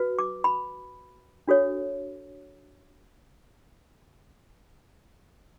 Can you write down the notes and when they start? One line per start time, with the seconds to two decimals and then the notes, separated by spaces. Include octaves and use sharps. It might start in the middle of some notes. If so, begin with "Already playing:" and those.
Already playing: F#4 B4
0.19 D6
0.44 B5
1.48 D4 F#4 A4 C#5